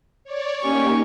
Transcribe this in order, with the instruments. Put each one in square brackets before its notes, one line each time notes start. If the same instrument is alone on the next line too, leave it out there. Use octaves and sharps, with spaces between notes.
[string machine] C#5 D5
[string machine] A#3 D#4 G4 [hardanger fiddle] C#4 C#6